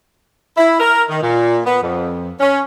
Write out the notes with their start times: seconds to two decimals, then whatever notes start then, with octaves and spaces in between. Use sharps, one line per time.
0.55 E4
0.79 A#4
1.09 D#3
1.21 A#2
1.64 B3
1.81 F2
2.39 C#4